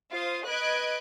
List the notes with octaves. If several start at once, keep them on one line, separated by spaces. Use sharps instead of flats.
F4 C5 F5 D#6
B4 D#5 F#6 G#6 D7